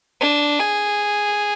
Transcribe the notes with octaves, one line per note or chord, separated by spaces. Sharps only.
D4
G#4